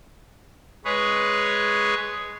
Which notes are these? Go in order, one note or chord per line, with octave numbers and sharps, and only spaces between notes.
G#3 G#4 B4 C#5